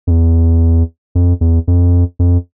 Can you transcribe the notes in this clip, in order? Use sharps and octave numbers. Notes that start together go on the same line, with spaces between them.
F2
E2
F2
E2
F2
F2